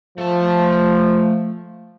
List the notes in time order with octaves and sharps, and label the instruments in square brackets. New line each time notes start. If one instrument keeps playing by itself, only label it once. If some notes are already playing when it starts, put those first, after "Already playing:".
[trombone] F3 [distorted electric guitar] A3 A5